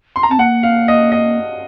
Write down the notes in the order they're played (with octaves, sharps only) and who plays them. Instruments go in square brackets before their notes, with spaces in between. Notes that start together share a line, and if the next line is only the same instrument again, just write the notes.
[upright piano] C6
A#5
[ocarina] C4 [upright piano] A5
[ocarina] A#3 [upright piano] F#5
[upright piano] F5
D#5
D#5